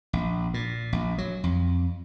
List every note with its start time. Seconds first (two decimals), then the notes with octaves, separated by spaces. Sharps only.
0.13 A#1
0.54 A#2
0.93 A#1
1.18 F#3
1.44 F2